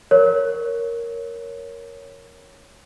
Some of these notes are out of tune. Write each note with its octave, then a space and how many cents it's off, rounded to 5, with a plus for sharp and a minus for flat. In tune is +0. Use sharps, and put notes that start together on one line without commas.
A#4 +0 C#5 +0